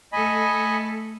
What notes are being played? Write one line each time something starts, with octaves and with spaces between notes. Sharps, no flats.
A3 A4 D#5 G#5 B5